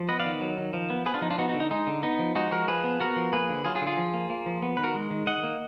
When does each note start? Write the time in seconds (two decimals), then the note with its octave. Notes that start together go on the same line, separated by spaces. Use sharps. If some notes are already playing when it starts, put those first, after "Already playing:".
Already playing: F3
0.09 B3 B4 D#5
0.20 D5 F5
0.25 D#3
0.41 F#3
0.57 D#3
0.73 F3
0.90 B3
1.06 B3 G#4 B4
1.14 D4 F4
1.22 F3 D#4
1.30 D4 F4
1.38 B3 D#4 F#4
1.49 D#4 F#4
1.54 D3
1.60 D#4
1.71 G#3 D#4
1.87 D3
2.03 B3 D#4
2.19 F3
2.35 G#3 D#4 F#4
2.51 F3 F#4 A#4
2.68 F3 G#4 B4
2.84 B3
3.00 B3 F#4 A#4
3.16 F3
3.33 A#3 G#4 B4
3.49 D3
3.65 F#3 F4 G#4
3.75 F4 G#4
3.81 D3
3.87 F4 G#4
3.97 F3
4.14 A#3
4.30 A#3
4.46 F3
4.62 B3
4.77 D#3 B4
4.84 F#4 A#4
4.95 G#3
5.11 D#3
5.26 D#3 D#5 F#5
5.43 A#3